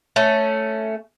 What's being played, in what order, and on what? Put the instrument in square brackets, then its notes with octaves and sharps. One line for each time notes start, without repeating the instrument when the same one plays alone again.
[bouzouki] A3 C#4